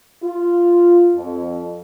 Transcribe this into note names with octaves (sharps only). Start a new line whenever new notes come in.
F4
F2